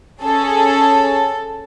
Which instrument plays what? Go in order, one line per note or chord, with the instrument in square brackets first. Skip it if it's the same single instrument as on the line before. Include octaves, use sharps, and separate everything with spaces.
[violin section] C#4 G#4 A4